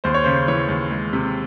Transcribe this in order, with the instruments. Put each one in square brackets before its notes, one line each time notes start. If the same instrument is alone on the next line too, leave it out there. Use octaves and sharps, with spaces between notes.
[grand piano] D#2 C5
C#5
C#3 C5
E3 C#5
D#2
G#3
C3